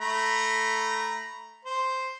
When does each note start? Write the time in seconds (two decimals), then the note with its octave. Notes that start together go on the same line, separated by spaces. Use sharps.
0.01 A3 A#5 B5
1.65 C5